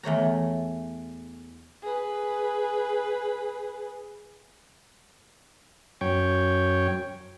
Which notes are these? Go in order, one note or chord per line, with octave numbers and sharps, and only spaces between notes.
E2 A3 C#5 A#5
G#4 B4
F#2 C#5 G5